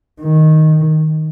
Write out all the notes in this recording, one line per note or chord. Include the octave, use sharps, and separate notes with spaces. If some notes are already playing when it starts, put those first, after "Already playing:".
D#3